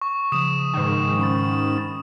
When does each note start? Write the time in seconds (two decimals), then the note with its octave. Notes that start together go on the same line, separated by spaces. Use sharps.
0.01 C#6
0.32 C#3 F3 D#6 E7
0.74 G#2 D#3
1.19 C#4 B5 A6